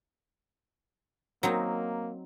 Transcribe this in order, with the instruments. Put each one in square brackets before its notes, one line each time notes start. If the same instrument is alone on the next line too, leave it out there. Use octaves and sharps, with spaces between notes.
[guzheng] F#3 C4 D#4 [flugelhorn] A#3